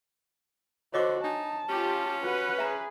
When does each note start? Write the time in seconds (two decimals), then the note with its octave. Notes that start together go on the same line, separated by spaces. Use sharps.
0.94 D3 F#4 C5 C#5 D#5 D6
1.24 D4 D#4 A5
1.69 C#4 F4 G4
2.22 F#4 B4 F#5
2.59 G#4 E5 A#5